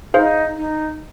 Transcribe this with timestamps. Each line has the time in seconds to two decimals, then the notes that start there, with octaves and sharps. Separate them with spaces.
0.14 D#4 G#4 C5 F5
0.57 D#4